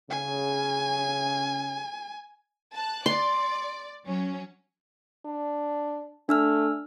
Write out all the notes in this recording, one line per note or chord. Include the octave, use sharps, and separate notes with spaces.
C#3 G#5
A5 F#6
D5 C6
F#3 C#4
D4
A3 D4 E6 F6